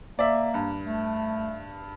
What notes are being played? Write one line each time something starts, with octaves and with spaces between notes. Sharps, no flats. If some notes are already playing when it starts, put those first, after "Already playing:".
A#3 D5 E5
G2
A3